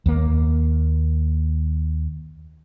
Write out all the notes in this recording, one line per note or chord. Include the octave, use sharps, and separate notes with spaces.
D#2 A#3